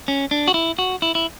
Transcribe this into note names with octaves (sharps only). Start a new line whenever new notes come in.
C#4
D4
F#4
E4
F#4
E4
E4